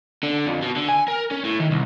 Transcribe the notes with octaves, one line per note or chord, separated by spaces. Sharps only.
D3
F2
B2
D3
G#5
A#4
C#4
A2
D#3
C2